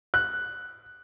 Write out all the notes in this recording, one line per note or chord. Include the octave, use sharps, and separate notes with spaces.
F#6